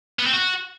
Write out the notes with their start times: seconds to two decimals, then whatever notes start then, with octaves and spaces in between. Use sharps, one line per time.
0.19 B3
0.26 C4
0.33 F#4